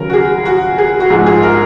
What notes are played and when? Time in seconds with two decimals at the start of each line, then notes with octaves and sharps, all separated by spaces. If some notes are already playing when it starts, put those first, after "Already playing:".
Already playing: D#2 C#3 F#3 A#4
0.10 F#4
0.13 G#4
0.46 F#4
0.78 G#4
1.00 F#4
1.10 A#1 G#2 F3 G#3 G#4
1.26 G#4
1.43 A#4